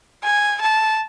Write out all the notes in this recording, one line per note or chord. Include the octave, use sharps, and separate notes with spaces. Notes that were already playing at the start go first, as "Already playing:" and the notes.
G#5
A5